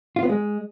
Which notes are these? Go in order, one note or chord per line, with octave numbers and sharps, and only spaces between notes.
F4
B3
G#3